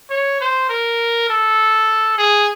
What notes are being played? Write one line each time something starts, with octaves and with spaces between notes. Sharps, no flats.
C#5
C5
A#4
A4
G#4